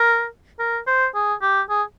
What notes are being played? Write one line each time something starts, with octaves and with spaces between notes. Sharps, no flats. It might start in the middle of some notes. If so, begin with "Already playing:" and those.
Already playing: A#4
A#4
C5
G#4
G4
G#4